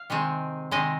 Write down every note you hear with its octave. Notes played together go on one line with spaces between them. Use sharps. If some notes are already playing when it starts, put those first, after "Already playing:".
Already playing: F5
C3 D#3 G#3 C4
C3 D#3 G#3 C4 D#5